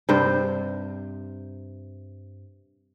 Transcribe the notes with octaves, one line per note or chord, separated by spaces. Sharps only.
G2 C3 C5